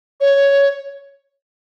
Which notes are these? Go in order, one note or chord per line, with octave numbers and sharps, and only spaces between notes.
C#5